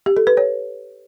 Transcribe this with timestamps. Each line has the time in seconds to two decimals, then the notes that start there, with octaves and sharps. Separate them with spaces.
0.06 G4
0.17 A4
0.27 B4
0.37 C#5